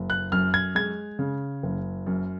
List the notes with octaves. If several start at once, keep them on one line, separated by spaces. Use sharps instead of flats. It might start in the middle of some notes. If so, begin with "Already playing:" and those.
Already playing: F#1
F#6
F#2 F6
G#6
G#3 G#6
C#3
F#1
F#2